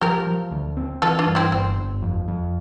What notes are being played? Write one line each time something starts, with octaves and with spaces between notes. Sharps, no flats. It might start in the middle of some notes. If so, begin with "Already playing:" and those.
F3 G4 A#4
F3
D2
C4
E3 F4 A4
D4 F4
G2
C4 E4
G1 C4
G1
F2
F2